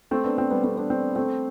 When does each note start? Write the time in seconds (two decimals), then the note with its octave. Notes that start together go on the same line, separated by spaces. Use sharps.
0.11 A3 C4
0.24 B3 D4
0.38 A3 C4
0.51 G3 B3
0.64 A3 C4
0.77 B3 D4
0.90 A3 C4
1.16 A3 C4